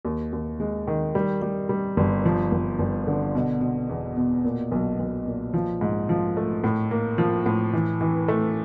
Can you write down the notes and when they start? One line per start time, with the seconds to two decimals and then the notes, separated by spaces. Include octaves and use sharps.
0.05 D#2
0.33 D#2
0.60 G#3
0.88 D#3
1.15 G3
1.42 G3
1.69 G3
1.97 G1
2.25 F3
2.52 G1
2.79 G1
3.07 D3
3.35 B2
3.61 B2
3.89 E2
4.17 B2
4.44 A#2
4.71 B1
4.99 B1
5.27 A#2
5.54 F3
5.81 G#2
6.09 F3
6.37 A3
6.64 A2
6.91 A#3
7.18 F3
7.46 A2
7.73 E3
8.01 E3
8.28 A3